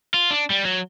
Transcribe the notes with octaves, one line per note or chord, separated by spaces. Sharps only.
F4
D4
G3
F#3